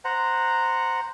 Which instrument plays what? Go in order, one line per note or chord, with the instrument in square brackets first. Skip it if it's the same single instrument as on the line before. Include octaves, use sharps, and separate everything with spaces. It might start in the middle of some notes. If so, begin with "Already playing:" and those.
[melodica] C5 F#5 A#5